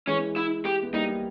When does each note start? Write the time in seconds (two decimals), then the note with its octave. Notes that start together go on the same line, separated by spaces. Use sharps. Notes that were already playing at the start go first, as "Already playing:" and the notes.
0.07 E3 G#3 C#4
0.36 E4
0.65 G4
0.83 B3
0.93 G3 A#3 D#4